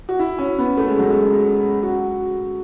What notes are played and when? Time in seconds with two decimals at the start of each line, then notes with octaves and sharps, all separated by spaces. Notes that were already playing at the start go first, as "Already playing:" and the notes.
0.09 F#4
0.19 E4
0.38 C#4
0.58 B3
0.77 A3
0.88 G#3
0.99 F#3
1.10 G#3
1.83 F#4